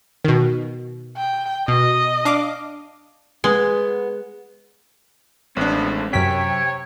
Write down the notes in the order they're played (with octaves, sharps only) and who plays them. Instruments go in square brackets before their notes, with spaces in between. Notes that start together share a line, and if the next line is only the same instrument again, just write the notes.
[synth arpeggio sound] B2 D#3
[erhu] G5
[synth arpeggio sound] B2 [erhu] D#5
[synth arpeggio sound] D4 F5 D6
[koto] G#3 [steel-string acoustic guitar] B3
[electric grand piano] A1 D4 [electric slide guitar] G#3 A3 C4 [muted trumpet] B3
[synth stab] F#2 B6 [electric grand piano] C3 [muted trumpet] C#5 [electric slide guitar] G5